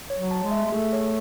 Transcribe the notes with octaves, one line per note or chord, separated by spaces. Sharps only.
C#5
F#3
A5
G#3
E5
G#3
A3 G#4
C#5